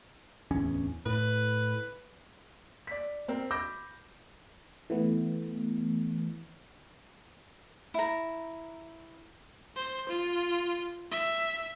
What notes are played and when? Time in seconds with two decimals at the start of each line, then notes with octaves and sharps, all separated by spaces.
0.51 D1 E2 C#4
1.06 A2 B4
2.87 D5 B6
3.28 C4 A#4
3.51 B5 D6 G6 A#6
4.90 E3 A3 B3
7.94 E4 A#5
9.76 C5
10.09 F4
11.11 E5